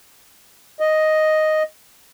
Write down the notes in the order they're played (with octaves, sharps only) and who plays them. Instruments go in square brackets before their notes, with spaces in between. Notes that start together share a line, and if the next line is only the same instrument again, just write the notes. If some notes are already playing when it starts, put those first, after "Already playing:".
[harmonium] D#5